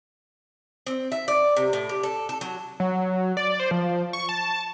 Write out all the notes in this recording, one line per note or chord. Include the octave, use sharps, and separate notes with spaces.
C4
E5
D5
C3
A2
G4
A4
A4
F#3
F#3
D5
C5
F3
C#6
A5